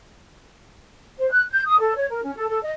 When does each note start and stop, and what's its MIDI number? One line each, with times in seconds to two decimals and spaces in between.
1.19 1.29 72
1.31 1.43 90
1.51 1.61 91
1.66 1.78 87
1.79 1.95 69
1.96 2.08 73
2.09 2.22 70
2.23 2.32 61
2.36 2.47 69
2.48 2.59 69
2.63 2.72 75